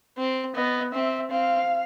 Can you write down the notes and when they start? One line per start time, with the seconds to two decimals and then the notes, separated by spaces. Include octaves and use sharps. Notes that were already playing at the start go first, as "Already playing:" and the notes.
0.17 C4
0.55 B3 D#5
0.93 C4 E5
1.31 C4 F5